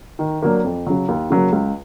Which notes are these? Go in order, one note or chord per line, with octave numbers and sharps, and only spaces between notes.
D#3
F#3 A#3 D4
F2
C#3 F#3
D#2
C#3 F#3 A#3
C#2